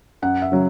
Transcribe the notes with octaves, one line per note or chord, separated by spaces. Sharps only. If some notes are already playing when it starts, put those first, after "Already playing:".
F#2 F#5
E5
C#3 F#3